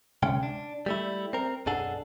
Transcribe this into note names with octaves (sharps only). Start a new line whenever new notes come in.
D2 C3 G#3 C#4 G5
D4
G3 A3 E4
C4 A#4
B1 F#2 D4 G#4 A4 F#5